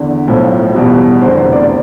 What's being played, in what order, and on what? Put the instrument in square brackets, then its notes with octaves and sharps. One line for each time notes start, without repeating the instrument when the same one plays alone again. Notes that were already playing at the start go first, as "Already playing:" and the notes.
Already playing: [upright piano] E2 D3
B1 A2 F3
E2 B2 G3
F1 E2 D3 C5
C5
D5